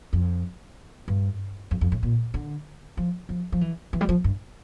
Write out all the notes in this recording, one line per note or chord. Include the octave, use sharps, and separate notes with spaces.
F2
G2
F2
F2
A2
A#2
D3
F3
F3
F3
E3
E3
G3
F3
G2